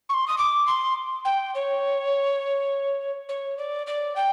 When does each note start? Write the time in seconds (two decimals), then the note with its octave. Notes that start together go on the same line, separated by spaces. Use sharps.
0.09 C#6
0.14 C6
0.28 D#6
0.38 D6
0.67 C6
1.25 G5
1.55 C#5
3.29 C#5
3.58 D5
3.87 D5
4.16 G5